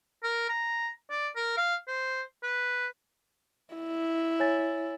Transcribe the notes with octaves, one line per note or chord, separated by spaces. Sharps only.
A#4
A#5
D5
A#4
F5
C5
B4
E4
C#5 G#5 A6